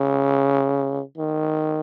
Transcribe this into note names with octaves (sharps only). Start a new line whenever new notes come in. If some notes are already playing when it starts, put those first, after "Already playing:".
Already playing: C#3
D#3